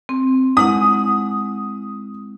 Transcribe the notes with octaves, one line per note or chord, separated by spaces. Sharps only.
C4
G#3 E4 F#5 D#6